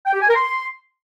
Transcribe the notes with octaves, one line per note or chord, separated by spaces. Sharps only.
G5
G4
G#5
A#4
C6